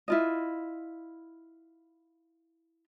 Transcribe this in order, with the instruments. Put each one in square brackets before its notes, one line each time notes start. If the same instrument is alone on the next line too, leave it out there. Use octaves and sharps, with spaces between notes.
[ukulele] E4 F4 D#5